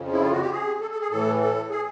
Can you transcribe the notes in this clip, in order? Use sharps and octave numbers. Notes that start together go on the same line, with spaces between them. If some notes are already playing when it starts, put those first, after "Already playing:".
Already playing: F2 C#3 F3
E4
F4
F#4
G4
G#4
A4
A4
G#4
A2 E3 A4
A4
G#4